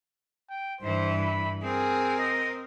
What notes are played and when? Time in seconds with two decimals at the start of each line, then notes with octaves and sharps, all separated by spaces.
0.50 G5
0.81 G2 E3 C5
1.20 B5
1.63 C4 G#4 A#4
2.19 D#5